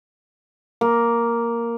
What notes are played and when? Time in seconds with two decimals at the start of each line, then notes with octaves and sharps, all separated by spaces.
0.81 A#3